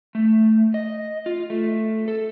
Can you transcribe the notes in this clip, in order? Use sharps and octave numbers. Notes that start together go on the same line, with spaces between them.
A3
D#5
F4
A3
A4